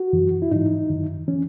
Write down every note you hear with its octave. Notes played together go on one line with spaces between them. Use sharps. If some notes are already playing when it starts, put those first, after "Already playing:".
Already playing: F#4
F#2 E3
E4
G#2 E3 D#4
F#2 D#3
E3 C#4